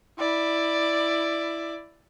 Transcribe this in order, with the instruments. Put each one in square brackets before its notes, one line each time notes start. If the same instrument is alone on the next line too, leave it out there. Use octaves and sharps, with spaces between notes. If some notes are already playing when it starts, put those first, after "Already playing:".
[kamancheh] E4 D5